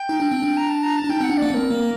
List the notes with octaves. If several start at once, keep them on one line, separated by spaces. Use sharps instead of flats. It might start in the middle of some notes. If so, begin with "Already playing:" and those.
Already playing: G5
D#4
D4
C4
D4
A#5
A5
A#5
A5
D4
D#4 G5
C4 F#5
D4
A#3 D5
C4 A#4 D5
A#3